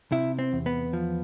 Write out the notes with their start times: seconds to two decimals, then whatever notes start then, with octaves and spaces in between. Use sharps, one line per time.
0.12 C3 E4
0.39 C4
0.53 E2
0.66 B3
0.93 F3